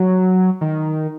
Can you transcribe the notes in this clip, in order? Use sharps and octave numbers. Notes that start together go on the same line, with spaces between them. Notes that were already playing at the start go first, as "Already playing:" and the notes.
Already playing: F#3
D#3